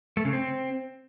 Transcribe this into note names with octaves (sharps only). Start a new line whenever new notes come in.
A3
C#3
C4